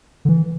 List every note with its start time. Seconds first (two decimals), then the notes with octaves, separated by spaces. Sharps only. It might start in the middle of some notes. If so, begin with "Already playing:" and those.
0.25 D3
0.29 E3